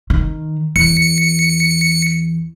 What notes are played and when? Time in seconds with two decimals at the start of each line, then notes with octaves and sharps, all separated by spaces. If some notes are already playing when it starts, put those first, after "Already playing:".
0.10 D#3
0.76 E2 C#7